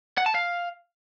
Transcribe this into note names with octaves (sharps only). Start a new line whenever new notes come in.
F#5
A5
F5